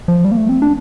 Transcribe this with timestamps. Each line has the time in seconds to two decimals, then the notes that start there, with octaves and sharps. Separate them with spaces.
0.08 F3
0.25 G3
0.32 A#3
0.37 A3
0.49 C4
0.62 D4